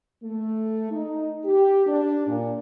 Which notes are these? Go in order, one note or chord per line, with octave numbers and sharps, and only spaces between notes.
A3
D#4
G4
D4
A#2